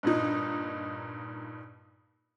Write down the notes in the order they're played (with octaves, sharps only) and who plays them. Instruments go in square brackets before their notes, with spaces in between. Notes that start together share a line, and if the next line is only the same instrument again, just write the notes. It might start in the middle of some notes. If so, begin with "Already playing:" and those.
[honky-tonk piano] G2 A#2 D#4